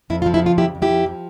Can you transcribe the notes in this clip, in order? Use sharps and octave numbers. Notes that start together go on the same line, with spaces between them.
F2 E4
F4
F3
E4 G4
C#3 F4
F2 E4 G4
F2
E4 G4
F3
F3